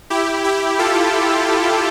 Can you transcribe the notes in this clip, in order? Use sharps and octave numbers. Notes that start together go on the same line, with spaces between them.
E4 G4
E4 G4
F4 A4